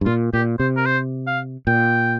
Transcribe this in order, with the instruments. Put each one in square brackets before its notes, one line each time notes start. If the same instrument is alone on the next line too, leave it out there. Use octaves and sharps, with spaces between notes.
[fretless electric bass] G2
[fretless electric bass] A#2 [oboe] F4
[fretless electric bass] A#2 [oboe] G4
[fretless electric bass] C3 [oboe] C5
[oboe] A#4
C5
F5
[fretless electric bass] A#2 [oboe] G5